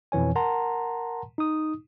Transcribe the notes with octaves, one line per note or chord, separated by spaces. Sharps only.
F2 B2 E3 C#5 G#5
A#4 F#5 A5 A#5 C6
D#4 D#6